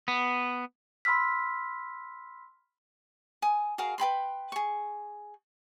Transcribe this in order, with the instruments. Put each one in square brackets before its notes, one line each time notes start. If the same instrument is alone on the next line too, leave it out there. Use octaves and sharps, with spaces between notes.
[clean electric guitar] B3
[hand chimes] B5 C6 E6 F6 B6
[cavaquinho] G#5 D#6
F#4 G#4 A#4 F5
B4 G5 B5 C6
G#4 C#6